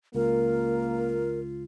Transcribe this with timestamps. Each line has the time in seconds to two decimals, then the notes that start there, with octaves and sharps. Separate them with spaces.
0.15 C#2 A#3 F4 A#4